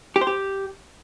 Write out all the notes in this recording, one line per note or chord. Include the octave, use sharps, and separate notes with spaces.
G4
C5
G4